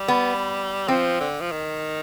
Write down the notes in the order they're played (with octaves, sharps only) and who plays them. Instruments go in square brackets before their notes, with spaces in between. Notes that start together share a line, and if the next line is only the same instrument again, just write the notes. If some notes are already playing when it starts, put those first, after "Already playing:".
Already playing: [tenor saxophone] G3
[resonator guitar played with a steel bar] B3
[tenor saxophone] F3 [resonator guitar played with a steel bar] C4
[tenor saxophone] D3
F3
D#3